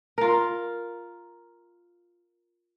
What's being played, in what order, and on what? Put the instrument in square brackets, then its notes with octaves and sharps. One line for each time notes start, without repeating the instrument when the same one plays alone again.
[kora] F4 A#4